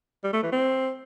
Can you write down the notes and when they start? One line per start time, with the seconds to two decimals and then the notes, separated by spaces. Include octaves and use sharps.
0.24 G3
0.33 A3
0.43 E3
0.52 C4